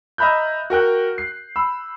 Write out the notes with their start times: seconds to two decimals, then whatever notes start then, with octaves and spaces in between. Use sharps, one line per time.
0.18 D#5 E5 A#5 B5 F#6 G6
0.70 F#4 A#4 G5 F#6
1.18 C7
1.56 B5 E6